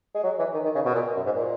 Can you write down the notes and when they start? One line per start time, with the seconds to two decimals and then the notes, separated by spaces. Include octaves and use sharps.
0.14 G#3
0.24 F#3
0.39 E3
0.54 D#3
0.65 D#3
0.75 C#3
0.85 B2
0.95 A#2
1.15 F#2
1.26 G#2
1.36 A#2